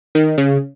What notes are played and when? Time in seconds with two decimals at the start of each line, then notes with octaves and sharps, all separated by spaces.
0.15 D#3
0.38 C#3